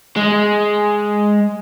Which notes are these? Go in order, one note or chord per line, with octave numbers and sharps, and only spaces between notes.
G#3